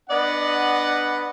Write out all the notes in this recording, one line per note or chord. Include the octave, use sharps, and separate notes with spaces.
B3 D4 B4 D5 D#5 F#5